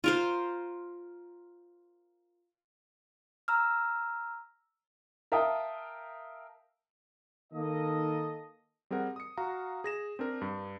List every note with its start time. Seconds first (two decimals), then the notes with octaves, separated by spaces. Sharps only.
0.04 F4 A#4 C5
3.48 A#5 E6 F6
5.32 A#4 E5 F5 G5 A5 D#6
7.53 D#3 A#3 A4 D#5
8.91 G3 C4 G#4 A#4 F#5
9.16 D#6 C#7
9.37 F#4 F5 A#5
9.84 G#4 A#6 E7
10.19 C4 D4 A#4
10.41 G2